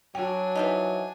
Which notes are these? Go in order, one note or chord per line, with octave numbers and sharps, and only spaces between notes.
F#3 D4 F#4 G5 G#5
E3 F3 D#4